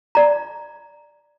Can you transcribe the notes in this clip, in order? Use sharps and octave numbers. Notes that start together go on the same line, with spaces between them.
D5 A#5